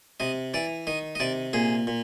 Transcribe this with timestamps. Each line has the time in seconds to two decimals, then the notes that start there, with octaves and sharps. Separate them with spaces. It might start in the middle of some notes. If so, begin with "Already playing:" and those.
0.20 C3 D#5
0.54 E3 D5
0.87 D#3 D#5
1.15 D#5
1.20 C3 D5
1.53 A#2 G#4
1.87 A#2